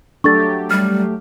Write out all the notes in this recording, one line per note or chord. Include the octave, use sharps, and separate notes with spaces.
F#3 A3 D4 G4 A4 C#6 A6
G3 F6